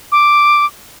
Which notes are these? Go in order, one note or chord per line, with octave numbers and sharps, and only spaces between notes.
D6